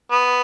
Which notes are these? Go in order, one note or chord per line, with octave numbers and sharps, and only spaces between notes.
B3